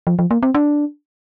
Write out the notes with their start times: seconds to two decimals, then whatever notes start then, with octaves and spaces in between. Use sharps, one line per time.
0.07 F3
0.19 F3
0.31 A#3
0.43 C4
0.54 D4